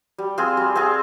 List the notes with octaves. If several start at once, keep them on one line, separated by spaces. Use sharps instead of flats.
G3
C4 F4 G#4
G3
C4 F4 G#4